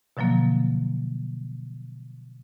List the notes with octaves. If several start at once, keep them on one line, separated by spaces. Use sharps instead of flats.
B2 D3 F3 F#3 A#3